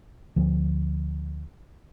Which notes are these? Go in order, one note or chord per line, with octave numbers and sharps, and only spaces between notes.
D2 F3